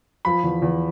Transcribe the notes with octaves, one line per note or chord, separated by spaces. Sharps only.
F3 B5
E2
E2